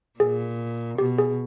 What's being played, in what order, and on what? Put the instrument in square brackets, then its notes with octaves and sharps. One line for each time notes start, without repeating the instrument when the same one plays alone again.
[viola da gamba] A#2 [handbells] G#4
[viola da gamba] B2 [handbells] G4
[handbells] G#4